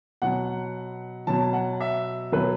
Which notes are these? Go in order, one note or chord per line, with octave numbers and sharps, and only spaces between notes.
B2 F#3 F#5
B2 F#3 A5
F#5
E5
B2 F#3 B4